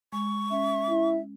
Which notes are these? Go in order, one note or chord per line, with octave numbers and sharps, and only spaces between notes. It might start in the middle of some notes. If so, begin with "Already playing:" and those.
G#3 C#6
C#4 E5
E4